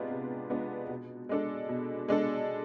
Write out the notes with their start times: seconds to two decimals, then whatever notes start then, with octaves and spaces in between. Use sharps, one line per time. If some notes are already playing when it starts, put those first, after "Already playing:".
Already playing: C3 G#3 B3 D4 F4
0.10 C3
0.50 G#3 B3 D4 F4
0.89 B2
1.29 G#3 D4 A4
1.69 B2
2.08 G#3 D4 A4